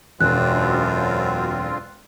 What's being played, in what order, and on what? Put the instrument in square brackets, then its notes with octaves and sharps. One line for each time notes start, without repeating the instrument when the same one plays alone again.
[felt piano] E1 [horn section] F#2 [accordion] D3 C4 F4 [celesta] F#6